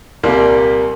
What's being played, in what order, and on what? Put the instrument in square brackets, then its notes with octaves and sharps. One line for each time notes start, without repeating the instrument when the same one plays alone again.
[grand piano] C2 A#2 G3 A#3